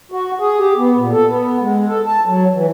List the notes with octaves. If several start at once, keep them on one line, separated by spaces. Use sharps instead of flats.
F#4
G#4
G4
B3
A#2
A4
B3
G#3
A4
A5
F#3
E3